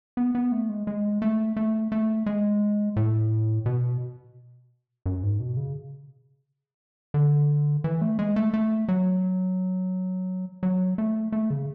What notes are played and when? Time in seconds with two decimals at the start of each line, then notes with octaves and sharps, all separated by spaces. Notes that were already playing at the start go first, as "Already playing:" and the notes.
0.17 B3
0.35 B3
0.52 A3
0.70 G#3
0.87 G#3
1.22 A3
1.57 A3
1.92 A3
2.26 G#3
2.96 A2
3.66 B2
5.06 F#2
5.23 G#2
5.40 B2
5.57 C#3
7.14 D3
7.84 E3
8.01 A3
8.19 G#3
8.36 A3
8.54 A3
8.88 F#3
10.63 F#3
10.98 A3
11.32 A3
11.50 C#3